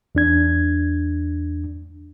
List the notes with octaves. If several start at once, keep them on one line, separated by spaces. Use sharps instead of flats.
E2 D4 G#6